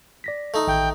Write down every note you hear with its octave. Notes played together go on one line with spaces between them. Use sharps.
D5 A#6 B6
A3 D#4
A1 D#3 E5 G5